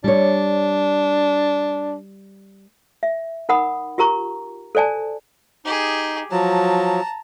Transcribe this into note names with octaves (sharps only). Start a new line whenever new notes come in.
G3 D4 C#5
E5
D#4 A#4 F#5 B5 D#6
F4 G4 A#4 A#5 C#6
A4 C5 D5 G#5 A5
D#4 G4 G#4
F3 F#3 A5 A#5